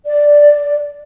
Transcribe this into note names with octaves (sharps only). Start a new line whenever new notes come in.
D5